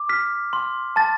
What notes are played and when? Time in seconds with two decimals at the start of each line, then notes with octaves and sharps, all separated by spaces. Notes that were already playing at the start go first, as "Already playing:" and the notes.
Already playing: D6
0.09 F6 B6
0.53 C6
0.96 A5 A6